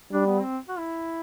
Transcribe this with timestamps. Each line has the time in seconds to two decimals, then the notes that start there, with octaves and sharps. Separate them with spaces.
0.12 G3 D4
0.26 B3
0.42 C4
0.69 F#4
0.79 E4